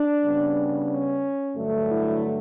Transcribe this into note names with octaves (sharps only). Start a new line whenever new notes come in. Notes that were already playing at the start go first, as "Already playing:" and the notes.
Already playing: D4
C#3 G3 B3
C#4
G2 D3 F#3 A3
E4